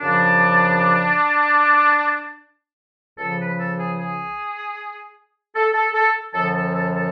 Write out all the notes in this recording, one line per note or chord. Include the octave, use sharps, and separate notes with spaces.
F#2 C#3 F3 D4
C#2 C#3 F3 A4
B4
A4
G#4
G#4
A4
A4
A4
F#2 D3 F3 A4
A4
A4
A4